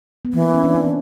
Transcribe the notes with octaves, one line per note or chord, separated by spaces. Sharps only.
B3
E3 A#3
C#4
D4
D4
C4